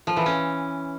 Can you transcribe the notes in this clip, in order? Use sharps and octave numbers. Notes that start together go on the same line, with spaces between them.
F3
E3
C#4